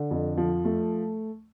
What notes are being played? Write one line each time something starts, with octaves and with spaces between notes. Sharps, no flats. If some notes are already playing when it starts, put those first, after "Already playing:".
Already playing: D3
F2
F3
A3